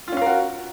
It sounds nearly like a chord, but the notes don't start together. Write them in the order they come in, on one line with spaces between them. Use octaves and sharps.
F4 C#4 F5 A#4 F#4